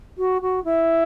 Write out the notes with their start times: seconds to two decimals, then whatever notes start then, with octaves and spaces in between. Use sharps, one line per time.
0.18 F#4
0.42 F#4
0.64 E4